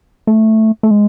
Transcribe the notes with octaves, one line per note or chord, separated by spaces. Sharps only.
A3
A3
G#3